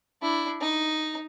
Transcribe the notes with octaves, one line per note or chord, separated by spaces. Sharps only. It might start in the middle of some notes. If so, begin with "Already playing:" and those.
D4 E4
D#4